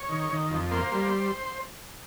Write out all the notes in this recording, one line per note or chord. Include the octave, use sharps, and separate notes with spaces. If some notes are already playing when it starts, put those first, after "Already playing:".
Already playing: C#5
D#3
D#3
F2
A#3 C5
G3